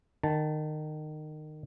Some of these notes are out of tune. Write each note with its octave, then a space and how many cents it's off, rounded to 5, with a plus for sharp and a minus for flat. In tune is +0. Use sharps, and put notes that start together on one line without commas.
D#3 -25 A5 +0